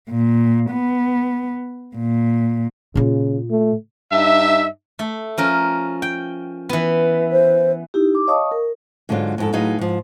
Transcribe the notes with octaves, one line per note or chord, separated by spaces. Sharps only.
A#2
B3
A#2
A#2 C#3 F4
A3
G2 D#4 E5
A3 A4
F3 C#4 A#4
G5
E3 B3
C5
D#4 E4 G4
D6
C#5 D#5 F5 A5 C#6 D#6
A#4
G#2 D3 F#3 G#3 F4
F2 G#2 A4
A2 F#3 D#4 G#4 B4 F5
G#2 F3